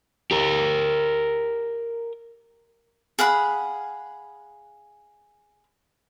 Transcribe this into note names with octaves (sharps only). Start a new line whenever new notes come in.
G4 A#4
G#4 F5 F#5 B5